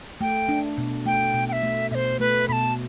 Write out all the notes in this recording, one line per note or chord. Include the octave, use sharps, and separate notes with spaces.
A3 G5
D4
B2
A3 G5
B2
G5
E5
A3
B2 C5 E5
A3 B4
B2 A5 B5